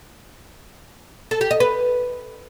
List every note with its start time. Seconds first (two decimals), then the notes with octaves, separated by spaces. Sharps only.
1.31 A4
1.41 G4
1.51 D#5
1.60 B4